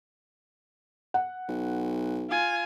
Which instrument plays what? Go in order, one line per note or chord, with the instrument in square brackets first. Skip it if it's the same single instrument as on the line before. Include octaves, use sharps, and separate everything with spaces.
[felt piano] F#5
[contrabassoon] B1
[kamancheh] F4 G#5